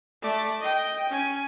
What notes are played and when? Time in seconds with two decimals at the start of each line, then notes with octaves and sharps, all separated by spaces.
0.22 A3 D5
0.61 D#5 G5
1.09 C#4 G#5